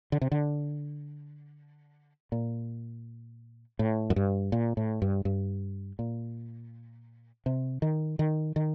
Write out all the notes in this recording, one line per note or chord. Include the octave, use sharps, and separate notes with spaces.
D3
C3
D3
A#2
A2
F#2
G2
A#2
A2
G2
G2
A#2
C3
D#3
D#3
D#3